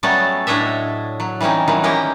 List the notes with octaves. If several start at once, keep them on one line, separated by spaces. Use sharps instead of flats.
F#3 G3 A3 B3 C#4 A4
A2 D4 C#5 D#5 E5
F#3
E3 G3 C4 C#4 D#4
D#3 E3 F#3 G3
A#3 C#4 E4 G4 D#5 G5